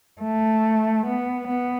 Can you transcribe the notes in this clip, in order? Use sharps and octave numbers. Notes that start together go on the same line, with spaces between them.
A3
B3
B3